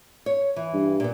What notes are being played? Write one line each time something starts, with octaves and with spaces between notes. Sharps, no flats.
C#5
E3
G2
A#2 B3